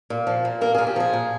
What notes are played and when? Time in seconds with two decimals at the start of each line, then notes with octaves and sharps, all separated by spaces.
0.10 A#2
0.27 F3
0.45 A#2
0.61 A#3 A#4
0.75 A#2 G#4
0.87 G4
0.96 F3 G#4
1.13 A#2